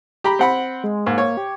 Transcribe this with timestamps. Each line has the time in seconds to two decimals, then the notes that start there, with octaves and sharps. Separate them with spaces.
0.24 G4 A#5 B5
0.39 C4 F#5 B5
0.83 G#3
1.06 G#2 A#3
1.18 C#5
1.37 G4